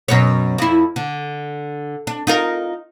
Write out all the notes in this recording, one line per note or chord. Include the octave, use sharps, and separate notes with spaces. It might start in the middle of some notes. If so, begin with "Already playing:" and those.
F#2 B2 C#5
F2 E4
D3
D4
D#4 F4 A#4